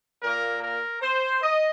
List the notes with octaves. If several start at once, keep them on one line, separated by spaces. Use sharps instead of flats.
A#2 A#3 A#4
A#4
C5
D#5